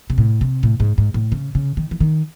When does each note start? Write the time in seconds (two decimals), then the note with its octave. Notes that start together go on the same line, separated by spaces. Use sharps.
0.10 C3
0.18 A2
0.41 C3
0.63 A2
0.80 G#2
0.98 G#2
1.14 A2
1.32 C#3
1.55 C#3
1.77 D#3
1.91 E3
2.00 D#3